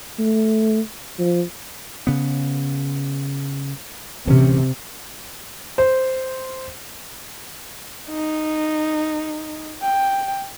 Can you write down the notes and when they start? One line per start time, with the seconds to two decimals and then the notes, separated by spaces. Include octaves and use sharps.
0.19 A3
1.19 F3
2.07 C#3 B3
4.27 D1 C3 E3 C#4
5.78 C5
8.09 D#4
9.81 G5